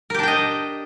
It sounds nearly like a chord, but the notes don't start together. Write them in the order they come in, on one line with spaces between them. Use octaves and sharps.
A#4 G4 D4 G5 D#5